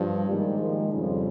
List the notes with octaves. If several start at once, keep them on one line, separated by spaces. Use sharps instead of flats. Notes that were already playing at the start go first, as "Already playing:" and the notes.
Already playing: G2 F3
G#2 D#3 G3 A#3
F3 G#3
F2 C#3 F3 G3